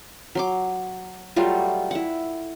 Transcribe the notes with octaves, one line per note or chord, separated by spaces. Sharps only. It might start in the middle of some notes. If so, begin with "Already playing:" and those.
F#3 C6 D6
F#3 G3 A3 F4
E4 F#5